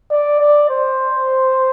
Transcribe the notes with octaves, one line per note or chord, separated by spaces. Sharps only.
D5
D5
C5